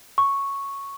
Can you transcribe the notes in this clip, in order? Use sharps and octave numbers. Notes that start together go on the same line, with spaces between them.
C#6